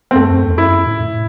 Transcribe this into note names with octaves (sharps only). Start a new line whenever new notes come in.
C4
F#2 A3
F#2
E2
F#2 E4
A2
A2